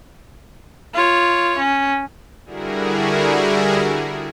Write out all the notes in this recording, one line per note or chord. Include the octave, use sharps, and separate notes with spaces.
F4 C#5
C#4
D3 G3 E4 F#4 G#4 A#4